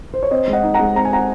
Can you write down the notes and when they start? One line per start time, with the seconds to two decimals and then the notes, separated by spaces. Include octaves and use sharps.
0.14 C5
0.23 C#5
0.31 C4 C5 D#5
0.48 G#3
0.53 D#5 F#5
0.63 D#4
0.74 F#5 A#5
0.79 G#3
0.96 C4 A#5
1.05 G#5
1.12 C4 F#5 A#5